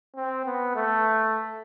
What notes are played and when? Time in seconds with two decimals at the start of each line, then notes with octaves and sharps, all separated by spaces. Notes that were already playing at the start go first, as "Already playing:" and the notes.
0.16 C4
0.45 B3
0.75 A3